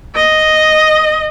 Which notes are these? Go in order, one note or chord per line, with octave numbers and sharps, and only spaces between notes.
D#5